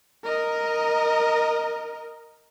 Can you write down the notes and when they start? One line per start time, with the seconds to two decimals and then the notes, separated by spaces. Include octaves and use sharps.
0.24 A#4 D#5